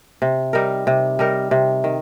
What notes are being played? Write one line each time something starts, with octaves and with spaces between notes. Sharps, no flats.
C3
G3 D#4 A#4
C3
G3 D#4 A#4
C3
D#3